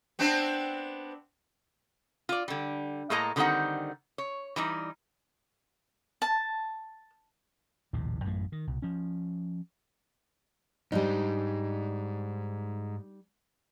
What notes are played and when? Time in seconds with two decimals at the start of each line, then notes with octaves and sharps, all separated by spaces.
0.19 B3 C4 D4
2.29 F4 D5
2.48 D3 G3
3.10 A2 G#3 A#3 A4 D#5 A#5
3.36 D3 D#3 G3 C4 D#4 F#5
4.18 C#5
4.56 E3 G3 D#4
6.22 A5
7.93 A#1 D#2 A2 C3
8.24 A1 F#2 A2 A3
8.52 D#3
8.67 C2 B2
8.82 F3 C#4
10.92 G#2 G3 D4 D#4